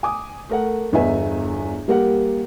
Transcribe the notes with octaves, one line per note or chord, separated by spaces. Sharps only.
G#5 D6 D#6
A3 A#4 F#5
G1 E2 B4 D#5 E5 G#5
G3 A#3 G4 A#4 F#5